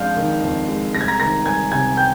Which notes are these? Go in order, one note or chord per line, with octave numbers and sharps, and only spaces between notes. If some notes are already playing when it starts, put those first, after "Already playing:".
Already playing: F2 G#3 D4 F5 F6 G6
D#3
F2
G#3
C2 A#6
G#6
A#5 A#6
D#3 A#5 A#6
G3 G#5 G#6
C3 G#5 G#6
G5 G6